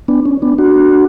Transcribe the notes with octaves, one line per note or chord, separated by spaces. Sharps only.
B3 D4
C#4
B3 D4
D4 F#4